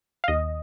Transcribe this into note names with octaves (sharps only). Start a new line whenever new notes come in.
F5
D#2 D#5